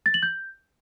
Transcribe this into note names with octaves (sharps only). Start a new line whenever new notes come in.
A6
F#7
G6